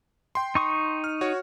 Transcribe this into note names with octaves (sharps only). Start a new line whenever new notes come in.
G5 C6
D#4 C#6 D#6
F6
F#4 C#5